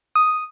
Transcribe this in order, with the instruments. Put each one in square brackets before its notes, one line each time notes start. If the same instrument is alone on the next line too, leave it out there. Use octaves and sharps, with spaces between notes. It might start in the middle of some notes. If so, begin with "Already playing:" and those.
[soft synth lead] D#6